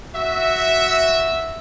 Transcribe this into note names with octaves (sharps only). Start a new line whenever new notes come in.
F#4 E5